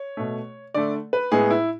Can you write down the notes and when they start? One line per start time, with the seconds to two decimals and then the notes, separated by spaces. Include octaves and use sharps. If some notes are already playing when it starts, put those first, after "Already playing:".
Already playing: C#5
0.17 B2 A3
0.74 D3 A3 D5
1.13 B4
1.31 A2 G#3 B3 G#4
1.51 E4